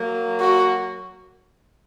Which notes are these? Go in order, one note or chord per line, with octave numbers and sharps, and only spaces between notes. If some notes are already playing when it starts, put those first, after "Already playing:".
Already playing: F#3 A#3
F#4